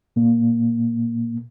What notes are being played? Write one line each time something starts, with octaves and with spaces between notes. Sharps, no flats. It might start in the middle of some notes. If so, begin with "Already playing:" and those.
A#2 A#3